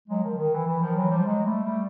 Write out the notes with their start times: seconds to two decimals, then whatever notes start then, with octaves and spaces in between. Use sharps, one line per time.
0.09 F#3 G#3
0.23 D#3 F3
0.37 D#3
0.53 E3
0.66 E3
0.81 D#3 F3
0.96 E3 F#3
1.10 F3 G3
1.25 F#3 G#3
1.44 G3 A3
1.64 G3 A3